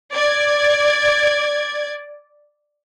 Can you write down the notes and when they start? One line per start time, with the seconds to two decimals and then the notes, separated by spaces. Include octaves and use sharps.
0.13 D5 G#6